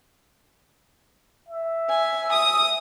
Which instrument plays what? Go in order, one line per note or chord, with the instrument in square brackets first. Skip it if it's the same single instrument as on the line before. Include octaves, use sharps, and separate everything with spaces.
[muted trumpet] E5
[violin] G#5
D#6